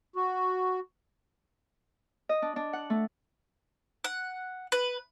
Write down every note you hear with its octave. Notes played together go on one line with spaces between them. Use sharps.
F#4
D#5
D4
D4
F#5
A3
F#5
B4